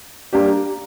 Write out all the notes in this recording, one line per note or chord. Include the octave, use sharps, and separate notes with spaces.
G3 A#3 D4 G4